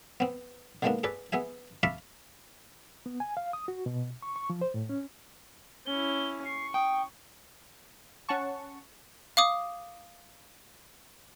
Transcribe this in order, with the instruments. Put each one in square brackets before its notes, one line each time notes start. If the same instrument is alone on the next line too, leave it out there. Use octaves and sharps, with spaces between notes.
[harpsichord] B3 C4
D3 D#3 G#3 A#3 B3 D4
G#4 A4 B4 D5
B3 G#4 E5 G#5
E5 F5 A5 B5 C#6 D6
[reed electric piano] B3
G#5
F5
D#6
F#4
B2
C#6
C#6
F3
C5
A2
C#4
[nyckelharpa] C#4 E4 [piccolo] G7
[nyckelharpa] C#6 [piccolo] C7
[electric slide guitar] G5 [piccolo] D#6
[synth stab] C#4 F#5 A5 C#6
[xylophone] F5 D6 D#6